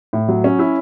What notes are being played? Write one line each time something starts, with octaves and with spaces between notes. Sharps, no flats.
A2
F#3
C#4
E4